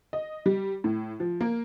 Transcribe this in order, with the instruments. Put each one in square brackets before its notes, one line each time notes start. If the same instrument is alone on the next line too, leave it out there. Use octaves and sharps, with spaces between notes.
[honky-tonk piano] D#5
G3
A2
F3
A#3